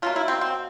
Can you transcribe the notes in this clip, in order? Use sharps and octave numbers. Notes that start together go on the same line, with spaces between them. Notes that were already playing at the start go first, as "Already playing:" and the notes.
B2 F#3 A#3 F4
E4
C4
C4